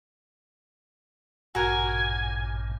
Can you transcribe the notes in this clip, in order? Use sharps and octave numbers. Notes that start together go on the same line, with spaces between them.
A1 G2 A#2 F#4 A#4 G#5